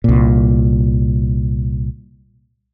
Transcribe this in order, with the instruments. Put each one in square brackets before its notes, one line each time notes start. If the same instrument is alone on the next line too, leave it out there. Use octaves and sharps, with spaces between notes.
[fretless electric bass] C2 A#2